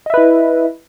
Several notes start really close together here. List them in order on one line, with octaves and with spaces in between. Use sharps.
D#5 E5 B4 E4